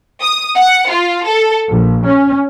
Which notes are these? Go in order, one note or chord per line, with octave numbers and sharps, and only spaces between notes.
D#6
F#5
F4
A4
A#1
C#4